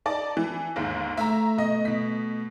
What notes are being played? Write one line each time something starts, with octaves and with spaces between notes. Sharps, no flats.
D#4 D5 A5
E3
G1 D#2 G#2
A3 E4 E5 A#5
B2 D#5
B2 B6